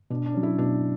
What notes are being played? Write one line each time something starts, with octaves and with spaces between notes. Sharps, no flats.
B2 D4
D4
F#3 C#4
E4
B2 D4